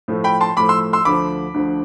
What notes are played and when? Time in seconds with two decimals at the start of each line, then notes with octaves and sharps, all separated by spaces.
0.08 A2 F3 A3
0.24 G5 B5
0.41 A5 C6
0.57 A2 F3 A3 B5 D6
0.69 C6 E6
0.93 C6 E6
1.05 D2 D3 F3 B5 D6
1.54 D2 D3 F3